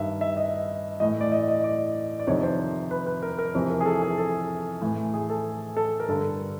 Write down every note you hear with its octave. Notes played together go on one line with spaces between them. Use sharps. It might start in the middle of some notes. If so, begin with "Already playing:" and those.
Already playing: G2 D#3 E5
E5
D#5
A2 E3 D#5
D5
D#5
D#5
D5
D5
F2 C3 D#3 C#5
C5
B4
B4
A#4
A#4
F2 C3 E3
A#4
G#4
A4
G#4
A4
A2 E3
G#4
A4
A4
A#4
G2 D3 A4